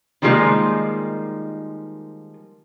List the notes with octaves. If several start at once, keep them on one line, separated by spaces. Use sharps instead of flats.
D#3 F3 G3 G#3 A#3 D#4